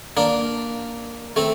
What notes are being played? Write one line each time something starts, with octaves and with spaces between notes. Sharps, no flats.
A#3 D4
A3 C4